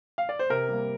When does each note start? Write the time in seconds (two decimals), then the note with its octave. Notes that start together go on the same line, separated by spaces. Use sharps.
0.18 F5
0.29 D5
0.39 C5
0.50 C3 A#4
0.69 G3 A#3